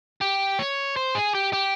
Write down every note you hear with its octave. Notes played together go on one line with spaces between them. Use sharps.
G4
C#5
C5
G#4
G4
G4